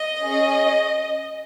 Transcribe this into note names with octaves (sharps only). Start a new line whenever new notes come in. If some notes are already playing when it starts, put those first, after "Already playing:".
Already playing: D#5
C#4 G#4